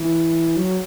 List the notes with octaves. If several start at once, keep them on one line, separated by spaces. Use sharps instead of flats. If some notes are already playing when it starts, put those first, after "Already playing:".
Already playing: E3
F#3